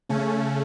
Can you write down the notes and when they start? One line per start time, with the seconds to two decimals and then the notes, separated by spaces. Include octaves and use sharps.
0.09 C#3 A3 C#4